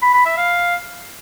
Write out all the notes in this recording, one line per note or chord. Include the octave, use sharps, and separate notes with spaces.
B5
B5
E5
F5